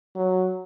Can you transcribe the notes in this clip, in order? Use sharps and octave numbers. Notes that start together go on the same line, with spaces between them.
F#3